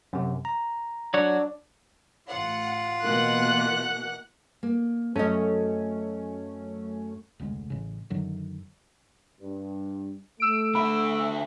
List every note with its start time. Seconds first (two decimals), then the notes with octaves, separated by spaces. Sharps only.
0.13 F#2 C3
0.45 A#5
1.14 F#3 D4 F#4 C#5
2.29 A1 F4 F#5
3.02 B2 E3 A#3 F#5 F#6
4.63 A#3
5.16 F#2 A3 C#4 A4 C#5 D#5
7.40 F1 D2 C#3 G#3
7.70 A1 C#3
8.10 F#2 D3 D#3 F#3
9.41 G2
10.40 A3 E6 D7
10.75 D3 E5 B5